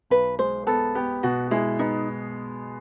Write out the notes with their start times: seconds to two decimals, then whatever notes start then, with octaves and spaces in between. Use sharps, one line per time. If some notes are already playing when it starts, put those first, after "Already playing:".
0.10 B1 B4
0.39 G#3 C5
0.67 B3 A4
0.95 B3 G4
1.23 B2 F#4
1.51 G#3 E4
1.79 B3 D#4